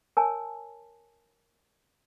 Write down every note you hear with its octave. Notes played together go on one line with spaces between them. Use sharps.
A#4 C#5 G#5 A5